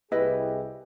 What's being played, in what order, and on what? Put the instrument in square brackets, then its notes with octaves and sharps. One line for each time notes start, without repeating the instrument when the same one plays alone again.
[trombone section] C2 G4 G#4 [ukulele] E4 B4 D#5